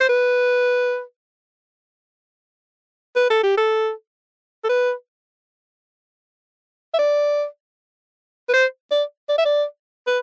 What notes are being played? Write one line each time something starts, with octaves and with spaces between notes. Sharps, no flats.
C5
B4
B4
A4
G4
A4
A4
B4
E5
D5
B4
C5
D5
D5
E5
D5
B4